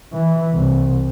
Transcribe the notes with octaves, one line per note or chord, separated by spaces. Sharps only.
E3
C2